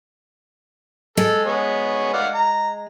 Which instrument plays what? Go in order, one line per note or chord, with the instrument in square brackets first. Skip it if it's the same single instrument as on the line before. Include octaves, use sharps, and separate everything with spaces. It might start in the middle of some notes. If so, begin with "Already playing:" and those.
[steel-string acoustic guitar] G#3 [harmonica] A4
[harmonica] B3 G#4 C#5
D5 F5 F#5
A#5